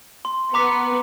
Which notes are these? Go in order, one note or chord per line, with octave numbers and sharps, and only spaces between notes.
C6
B3 A#5 D6 B6